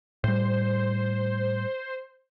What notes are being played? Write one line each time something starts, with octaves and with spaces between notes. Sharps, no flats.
A2 G3 C5